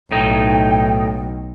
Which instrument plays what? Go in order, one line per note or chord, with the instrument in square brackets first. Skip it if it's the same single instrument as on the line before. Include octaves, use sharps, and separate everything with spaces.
[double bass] B1 [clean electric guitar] A2 D#4 [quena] G5